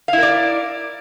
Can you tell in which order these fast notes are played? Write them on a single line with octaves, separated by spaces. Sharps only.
F5 E4 A#4 D5